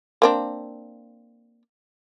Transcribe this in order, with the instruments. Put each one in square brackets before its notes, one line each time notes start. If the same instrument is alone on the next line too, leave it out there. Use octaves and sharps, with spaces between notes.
[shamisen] A#3 C4 D4